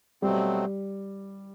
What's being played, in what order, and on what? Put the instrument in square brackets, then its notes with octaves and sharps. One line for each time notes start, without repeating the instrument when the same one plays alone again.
[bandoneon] B2 F#3 A3 C4 [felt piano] G3